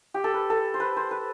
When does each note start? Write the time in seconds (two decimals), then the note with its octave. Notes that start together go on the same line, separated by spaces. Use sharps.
0.14 G4
0.24 A4
0.34 B4
0.50 A4
0.74 C5
0.80 B4
0.96 C5
1.11 B4